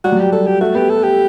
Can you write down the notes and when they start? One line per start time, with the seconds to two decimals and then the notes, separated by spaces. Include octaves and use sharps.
0.04 G3 F#4
0.12 F#3
0.19 G3 G4
0.32 G3 A4
0.47 G3 G4
0.61 A3 F#4
0.75 B3 G4
0.90 A4
1.03 G4